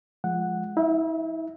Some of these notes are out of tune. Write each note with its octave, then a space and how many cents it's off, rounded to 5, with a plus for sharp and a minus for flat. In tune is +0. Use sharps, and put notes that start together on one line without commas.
F3 +0 G#3 +0 F#5 -5
E4 -40 E5 +15